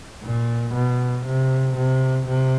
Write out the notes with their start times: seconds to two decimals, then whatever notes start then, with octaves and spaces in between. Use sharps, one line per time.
0.23 A#2
0.74 B2
1.25 C3
1.76 C3
2.27 C3